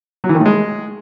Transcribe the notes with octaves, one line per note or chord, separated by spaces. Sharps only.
F#3
E3
D#3
A2
G#3